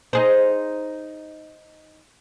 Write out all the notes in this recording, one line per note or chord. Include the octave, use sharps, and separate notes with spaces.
D#4 G#4 C5